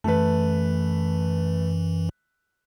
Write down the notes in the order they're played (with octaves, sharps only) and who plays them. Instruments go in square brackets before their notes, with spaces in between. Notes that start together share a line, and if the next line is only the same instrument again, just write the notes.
[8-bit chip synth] F#2 E3 [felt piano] A3 B4